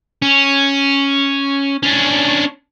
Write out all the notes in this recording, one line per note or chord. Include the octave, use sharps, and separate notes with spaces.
C#4
C#4 D4